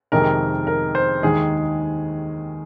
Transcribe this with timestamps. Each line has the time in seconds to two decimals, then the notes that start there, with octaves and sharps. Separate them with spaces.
0.12 F2 C3 D#3 G#3 A#4
0.67 A#4
0.95 C5
1.23 D#2 D#3 G#3 G#4